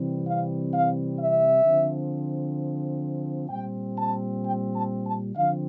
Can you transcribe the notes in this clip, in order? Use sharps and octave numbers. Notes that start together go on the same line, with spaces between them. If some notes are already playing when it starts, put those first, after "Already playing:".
Already playing: C3 E3 G3 C4
F5
F5
E5
D3 F3 C4
A#2 G3 C4 G5
A5
G5
A5
A5
D3 F3 C4 F5